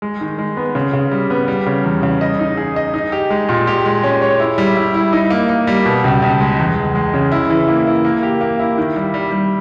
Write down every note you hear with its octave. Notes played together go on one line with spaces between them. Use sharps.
G#3
D#3
G#3
B3
C#3
C#3
G3
B3
G3
C#3
E2
C#3
D#5
D#4
G#4
D#5
D#4
G4
G#3
A#2
G4
G#3
C#4
C#5
E4
G3
E4
E4
D#4
A#3
A#3
G3
B2
C#2
C#2
G#3
E2
E2
G#3
C#3
E4
E3
A#3
E4
A#3
G4
A#3
E4
D#3
G3
G3
G3